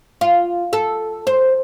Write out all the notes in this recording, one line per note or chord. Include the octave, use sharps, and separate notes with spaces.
F4
A4
C5